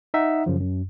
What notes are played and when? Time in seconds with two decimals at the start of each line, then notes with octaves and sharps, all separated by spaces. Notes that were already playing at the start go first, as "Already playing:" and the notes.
0.14 D#4 E5 F#5 A#5
0.46 F#2 C#3 F3
0.61 F#2